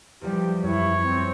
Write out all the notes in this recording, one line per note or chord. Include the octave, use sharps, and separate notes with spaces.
E2 F3 G3 G4
F#2 E4 C#5
C4